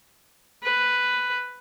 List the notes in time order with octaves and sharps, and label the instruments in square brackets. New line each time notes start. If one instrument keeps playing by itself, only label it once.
[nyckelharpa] B4